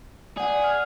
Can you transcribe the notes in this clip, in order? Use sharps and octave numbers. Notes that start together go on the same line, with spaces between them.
G#4 D5 F#5
F6